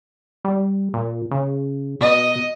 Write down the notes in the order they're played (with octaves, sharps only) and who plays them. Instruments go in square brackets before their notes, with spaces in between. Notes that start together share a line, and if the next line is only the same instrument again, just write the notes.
[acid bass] G3
A#2
C#3
[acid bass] B2 [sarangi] D#5